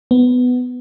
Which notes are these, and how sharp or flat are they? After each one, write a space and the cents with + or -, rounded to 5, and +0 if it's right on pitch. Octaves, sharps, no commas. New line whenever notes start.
B3 +10